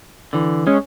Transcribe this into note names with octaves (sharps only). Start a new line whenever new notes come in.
D3 E3
G#3 C#4